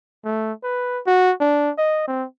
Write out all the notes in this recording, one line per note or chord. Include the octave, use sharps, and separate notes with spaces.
A3
B4
F#4
D4
D#5
C4